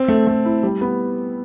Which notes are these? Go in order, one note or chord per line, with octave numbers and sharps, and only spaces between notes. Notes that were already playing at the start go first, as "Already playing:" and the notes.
Already playing: C4
A3
A3
E4
G3
B3